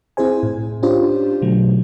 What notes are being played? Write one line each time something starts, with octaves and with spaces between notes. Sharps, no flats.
C4 E4 G#4 C5 G#5
A2
C#4 D4 F4 G4 C5
B2 D3 F#3 A3